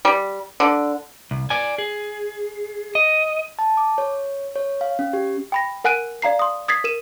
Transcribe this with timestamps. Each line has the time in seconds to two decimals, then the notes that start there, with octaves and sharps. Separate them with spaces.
0.05 G3
0.60 D3
1.31 C2
1.50 D5 G#5
1.78 G#4
2.95 D#5
3.59 A5
3.77 D6
3.98 C#5
4.56 C#5
4.81 F5
4.99 C#4
5.13 G4
5.52 G5 B5 A#6
5.84 A#4 F#5 G#5 F#6 D7 D#7
6.22 D5 F5 A#5 C7
6.39 C6 D#6
6.68 D#6 G#6 A6 B6 C7
6.84 A#4 D#7 E7